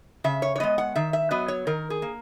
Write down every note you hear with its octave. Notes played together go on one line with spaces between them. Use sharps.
C#3 E5
C#5
C#5
G#3 B3 D#5
F#5
D#3 E5
E5
F#3 B3 D#5
C#5
D#3 A#4
G#4
A#3